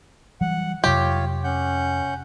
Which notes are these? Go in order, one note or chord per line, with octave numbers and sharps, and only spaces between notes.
E3 F#3 G3 F#5
F2 C3 F#3 F4 G4 C#5
C#4 F#5 G6